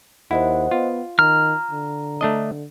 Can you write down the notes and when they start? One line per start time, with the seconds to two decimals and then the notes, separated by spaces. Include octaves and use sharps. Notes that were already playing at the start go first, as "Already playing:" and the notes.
0.31 D#2 E4 C5 D#5 F#5
0.71 B3 F4
1.19 D#3 A#5 F6
1.71 D3
2.21 A3 D4 D#5